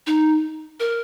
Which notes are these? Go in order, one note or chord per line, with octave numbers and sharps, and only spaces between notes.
D#4
A#4